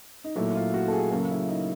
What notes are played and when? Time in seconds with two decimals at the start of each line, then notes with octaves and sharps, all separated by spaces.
0.24 D#4
0.36 A#2 F#3 A3 E4
0.55 F4
0.74 F#4
0.88 A4
0.92 G#4
1.11 C#3 F#3 A#3 A4
1.30 E4
1.49 D#4